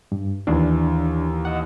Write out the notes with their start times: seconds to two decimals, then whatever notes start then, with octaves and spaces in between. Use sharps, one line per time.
0.12 G2
0.47 D#2 E3 D4
1.45 D#5 F#5